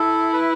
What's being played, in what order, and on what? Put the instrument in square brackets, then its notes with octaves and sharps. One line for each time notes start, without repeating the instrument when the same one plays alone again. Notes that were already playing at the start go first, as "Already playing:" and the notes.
Already playing: [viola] E4 [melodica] A4
[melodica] B4